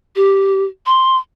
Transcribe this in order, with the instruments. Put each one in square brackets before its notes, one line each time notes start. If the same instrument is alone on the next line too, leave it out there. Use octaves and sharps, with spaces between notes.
[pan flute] G4
C6